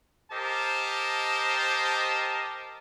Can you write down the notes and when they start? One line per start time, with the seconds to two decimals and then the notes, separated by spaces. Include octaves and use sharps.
0.31 G4 A#4 C5 D#5 A5